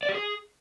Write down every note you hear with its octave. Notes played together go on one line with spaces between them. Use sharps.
D5
G4
G#4